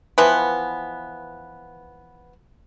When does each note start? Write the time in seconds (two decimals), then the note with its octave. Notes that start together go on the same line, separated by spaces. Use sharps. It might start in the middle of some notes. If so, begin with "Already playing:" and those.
0.18 E3 F3 B3 F#5